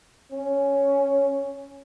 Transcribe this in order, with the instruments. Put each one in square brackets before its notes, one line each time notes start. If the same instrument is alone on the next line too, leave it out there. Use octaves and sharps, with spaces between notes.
[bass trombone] C#4